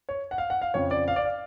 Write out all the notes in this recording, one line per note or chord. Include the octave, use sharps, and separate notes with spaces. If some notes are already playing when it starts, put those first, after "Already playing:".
C#5
F#5
F5
F#5
F5
F2 C#3 F3 C#5
D5
F5
D5
F5